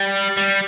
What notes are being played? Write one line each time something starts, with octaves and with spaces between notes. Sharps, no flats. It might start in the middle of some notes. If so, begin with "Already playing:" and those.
Already playing: G3
G3